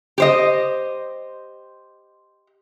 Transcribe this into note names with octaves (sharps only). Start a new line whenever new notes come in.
G4 C5 D#5